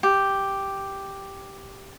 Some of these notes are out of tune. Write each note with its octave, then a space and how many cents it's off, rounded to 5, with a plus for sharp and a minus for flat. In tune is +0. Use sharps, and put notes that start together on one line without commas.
G4 +0